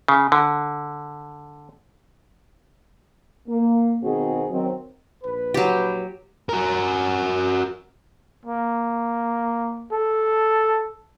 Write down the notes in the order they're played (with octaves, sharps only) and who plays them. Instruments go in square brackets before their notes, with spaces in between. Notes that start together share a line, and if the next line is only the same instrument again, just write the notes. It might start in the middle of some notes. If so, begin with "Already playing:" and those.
[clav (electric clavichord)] C#3
D3
[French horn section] A#3
B2 D#3 C4 F#4 G#4
D#3 F#3 C4
[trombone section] A#1 B4
[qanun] F#3 G4
[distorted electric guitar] F#4 A#4
[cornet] A#3
A4